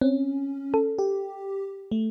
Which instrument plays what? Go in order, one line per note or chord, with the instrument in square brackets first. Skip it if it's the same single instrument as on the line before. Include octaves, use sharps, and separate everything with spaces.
[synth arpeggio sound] C4 [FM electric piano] C#4
[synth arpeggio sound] A4
[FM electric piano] G4
A3